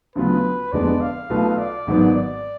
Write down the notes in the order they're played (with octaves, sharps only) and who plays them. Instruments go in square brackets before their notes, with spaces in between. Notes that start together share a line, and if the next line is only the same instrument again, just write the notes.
[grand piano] D2 C#3 F#3 B3 F4 [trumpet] B4
[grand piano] F1 F2 D3 G#3 B3 [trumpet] D5
[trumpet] F5
[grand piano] B1 B2 A3 F4 B4
[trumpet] D5
[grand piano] G#1 G#2 F#3 B3
[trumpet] D5